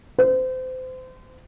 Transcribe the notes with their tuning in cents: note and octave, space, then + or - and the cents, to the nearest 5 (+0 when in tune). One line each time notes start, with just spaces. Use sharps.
C5 -30